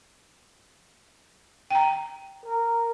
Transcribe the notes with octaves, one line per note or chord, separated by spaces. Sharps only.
G5 A#5
A#4